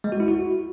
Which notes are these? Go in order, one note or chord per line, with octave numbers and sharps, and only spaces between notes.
G#3
F#4
E4
F#4